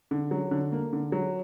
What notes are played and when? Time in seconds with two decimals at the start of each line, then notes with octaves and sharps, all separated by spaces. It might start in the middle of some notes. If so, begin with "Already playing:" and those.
0.11 D3
0.31 F#3
0.51 D3
0.72 A#3
0.93 D3
1.12 F#3